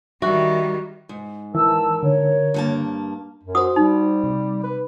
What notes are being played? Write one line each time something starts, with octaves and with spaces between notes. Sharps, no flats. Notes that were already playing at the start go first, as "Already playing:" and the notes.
D#3 G3 F#4 E5
G#2
E3 A#4 A5 E6
D3 C#5
G2 A#3 A5
F#2
F#4 C5 D#6
G3 D#4
C3
B4